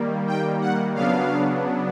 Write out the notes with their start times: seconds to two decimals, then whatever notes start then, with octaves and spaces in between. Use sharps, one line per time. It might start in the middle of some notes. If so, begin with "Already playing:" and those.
Already playing: D#3 G3 A#3
0.27 G5
0.61 F#5
0.95 C#3 F#3 B3 D4 F5